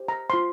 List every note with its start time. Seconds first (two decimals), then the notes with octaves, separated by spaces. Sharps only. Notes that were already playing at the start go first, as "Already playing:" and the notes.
Already playing: G4 C5
0.08 A#5
0.30 F4 C5 C6